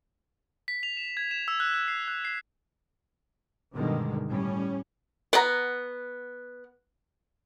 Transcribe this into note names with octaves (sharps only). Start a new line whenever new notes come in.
B6
F7
E7
G#6
E7
E6
F#6
E6
C7
F#6
C7
G2 B2 D3 D#3 G#3
A2 G3 C#4
B3 F#5 A#5